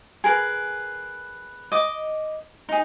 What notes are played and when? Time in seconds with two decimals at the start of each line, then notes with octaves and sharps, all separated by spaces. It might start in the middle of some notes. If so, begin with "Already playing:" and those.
0.24 G#4 A#4 B4
1.72 D#5 D6
2.69 D#4 G#4